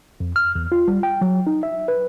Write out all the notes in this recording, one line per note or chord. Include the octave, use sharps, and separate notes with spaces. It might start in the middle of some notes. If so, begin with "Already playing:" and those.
F2
F6
E2
F4
G3
G5
F#3
D#4
E5
B4